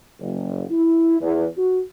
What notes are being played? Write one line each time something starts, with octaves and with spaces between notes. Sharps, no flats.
F#1
E4
E2
F#4